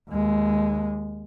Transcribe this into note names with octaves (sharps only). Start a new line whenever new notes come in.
D#2 G#3